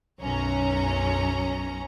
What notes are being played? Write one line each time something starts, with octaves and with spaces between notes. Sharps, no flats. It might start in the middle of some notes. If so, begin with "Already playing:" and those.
B1 F#2 C#4 A#5